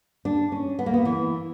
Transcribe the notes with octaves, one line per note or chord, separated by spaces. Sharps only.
D4
C#4
B3
A#3
B3
E3